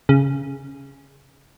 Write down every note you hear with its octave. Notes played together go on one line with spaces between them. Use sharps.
C#3